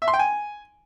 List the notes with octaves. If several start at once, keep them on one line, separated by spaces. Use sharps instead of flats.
E5
C6
G5
G#5